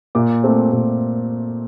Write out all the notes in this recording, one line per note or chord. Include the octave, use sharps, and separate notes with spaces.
A#2 D6
A3 C4
A#2